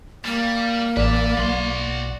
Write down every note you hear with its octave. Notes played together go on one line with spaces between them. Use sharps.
G3 A#3
A1 B4 D5 E5
B1 F#4 C6